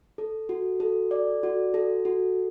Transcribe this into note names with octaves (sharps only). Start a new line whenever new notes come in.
A4
F#4
A4
D5
F#4
A4
F#4